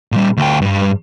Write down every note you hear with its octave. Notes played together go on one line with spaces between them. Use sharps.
A#2 G3
D2 G5
G2 G3